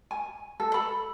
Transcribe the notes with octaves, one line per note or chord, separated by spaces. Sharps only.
G#5
A4
A4 B5